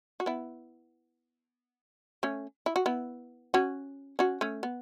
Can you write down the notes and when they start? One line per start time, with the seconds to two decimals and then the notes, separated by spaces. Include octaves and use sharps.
0.20 F#4
0.26 B3 E4
2.23 A3 C#4
2.66 E4
2.76 F#4
2.86 B3 E4
3.54 C#4 F#4
4.19 C#4 F#4
4.41 A3 C#4
4.63 B3